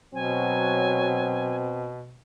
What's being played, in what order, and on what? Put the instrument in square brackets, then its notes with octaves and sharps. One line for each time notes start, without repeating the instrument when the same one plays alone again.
[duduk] B2 [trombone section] F#3 [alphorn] C4 [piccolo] G#5